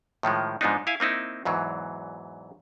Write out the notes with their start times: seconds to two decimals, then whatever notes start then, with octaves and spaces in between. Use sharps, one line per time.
0.23 A2 D#3 F3 G#3
0.61 G#2 F3 G#3 B3 D4 D#4
0.87 E4 F5 G#5
1.00 A#3 C4 D#4 E4
1.45 E2 G#2 E3 F#3